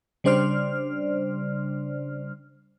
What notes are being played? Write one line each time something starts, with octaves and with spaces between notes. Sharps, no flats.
C#3 G3 D4 C5 D5 F6